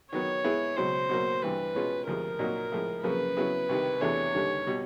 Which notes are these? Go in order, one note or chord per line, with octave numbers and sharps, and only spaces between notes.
D#3 F#3 B3 C#5
G#3 B3 E4 G#4
C#2 B2 F#3 C5
B2 F#3 A#3
G2 E3 G3 B4
B2 G#3 C#4 F4 G#4
D2 C3 F3 G#3 A#4
A#2 F#3 A#3 D#4 F#4
A2 F3 G#3
F#2 C#3 F3 A#3 B4
C#3 F#3 B3 E4 G#4
C2 C3 D#3
E2 C3 E3 A3 D4 C#5
D#2 D3 G3
B2 G3